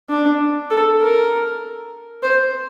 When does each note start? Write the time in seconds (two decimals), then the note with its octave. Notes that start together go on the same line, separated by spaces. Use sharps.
0.09 D4
0.70 A4
1.01 A#4
2.23 C5